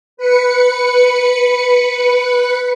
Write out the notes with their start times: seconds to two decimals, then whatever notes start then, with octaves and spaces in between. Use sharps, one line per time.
0.17 B4 C#7